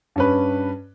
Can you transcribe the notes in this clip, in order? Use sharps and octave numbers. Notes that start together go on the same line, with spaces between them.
G2 C#4 B4